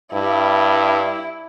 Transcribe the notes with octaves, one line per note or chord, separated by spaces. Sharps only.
G2 E4